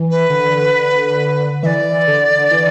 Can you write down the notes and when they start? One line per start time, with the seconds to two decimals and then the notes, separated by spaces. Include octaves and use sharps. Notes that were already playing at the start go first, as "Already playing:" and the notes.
Already playing: E3
0.10 B4
0.30 D3
1.63 E3 D5 E5
2.08 D3
2.51 E3